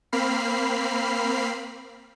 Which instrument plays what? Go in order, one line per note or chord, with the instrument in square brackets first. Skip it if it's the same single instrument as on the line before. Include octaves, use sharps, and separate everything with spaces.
[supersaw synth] A#3 C4 B5 F6 C7